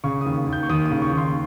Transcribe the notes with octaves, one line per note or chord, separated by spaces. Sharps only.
C#3 C#6
D#2 D#6
D#2
G6
C#6
D#2 D#6
D#6
C#3
C#6
D#2
C6